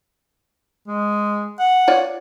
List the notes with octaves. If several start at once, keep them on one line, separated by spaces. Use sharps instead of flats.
G#3
F#5
F4 C#5 D5